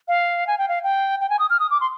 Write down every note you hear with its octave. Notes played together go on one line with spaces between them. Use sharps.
F5
G#5
G5
F5
G5
G5
G#5
D#6
F6
D#6
D6
C6